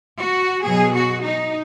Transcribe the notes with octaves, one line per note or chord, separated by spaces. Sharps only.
F#4
B2 F#3 B3 G#4
F#4
D#4